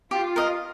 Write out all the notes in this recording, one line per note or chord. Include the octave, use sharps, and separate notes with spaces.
F4 G4
A#4 D#5